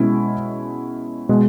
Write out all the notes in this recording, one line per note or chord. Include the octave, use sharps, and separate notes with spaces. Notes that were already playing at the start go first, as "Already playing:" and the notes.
Already playing: B2 G#3 C#4 E4
B2 G#3